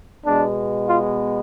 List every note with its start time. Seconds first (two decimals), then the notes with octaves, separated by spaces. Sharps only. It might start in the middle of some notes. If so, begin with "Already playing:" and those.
0.25 B2 G#3 B3 D4
0.88 F4